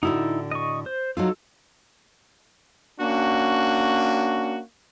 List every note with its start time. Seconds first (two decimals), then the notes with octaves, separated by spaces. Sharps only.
0.03 A2 D3 D#4 E4 F#4
0.51 D#5 C#6
0.86 C5
1.17 F#3 D#4 F4 A4
3.00 A#3 C#4 D4 F#4